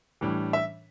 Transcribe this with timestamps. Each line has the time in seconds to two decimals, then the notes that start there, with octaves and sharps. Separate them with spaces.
0.21 A2 E3 G3 D4
0.53 E5